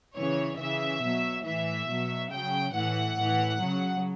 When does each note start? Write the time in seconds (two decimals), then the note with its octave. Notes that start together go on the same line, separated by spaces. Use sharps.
0.15 C#3 E3 C#5
0.60 C#3 E3 E5
1.02 B2 F#3
1.45 A2 E3 E5
1.88 B2 F#3
2.31 C#3 F#3 G5
2.74 A2 E3 F#5
3.18 A2 E3
3.61 C#3 F#3